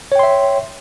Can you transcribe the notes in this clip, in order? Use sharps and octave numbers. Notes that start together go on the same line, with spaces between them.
C#5 E5 G5 C6